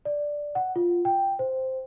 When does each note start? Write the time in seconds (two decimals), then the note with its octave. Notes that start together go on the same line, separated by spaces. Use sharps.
0.05 D5
0.55 F#5
0.76 F4
1.05 G5
1.39 C5